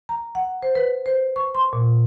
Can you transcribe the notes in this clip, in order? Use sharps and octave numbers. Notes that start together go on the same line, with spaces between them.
A#5
F#5
C5
B4
C5
C#6
C6
A#2